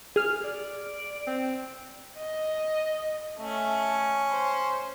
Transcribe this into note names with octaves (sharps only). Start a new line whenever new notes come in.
G#4 F6
D5
C4
D#5
A3 C#4
C5